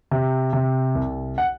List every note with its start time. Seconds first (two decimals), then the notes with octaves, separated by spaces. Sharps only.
0.11 C3
0.53 C3
0.95 C2
1.38 F#5